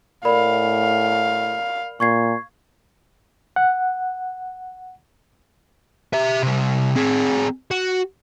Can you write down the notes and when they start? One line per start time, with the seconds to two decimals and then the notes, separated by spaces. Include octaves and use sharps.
0.25 A2 A#4 D5 F5 B5
2.00 A#2 C#6 G#6 C7
3.56 F#5
6.13 G4 E5
6.43 C3 G3
6.96 C4 G#4
7.71 F#4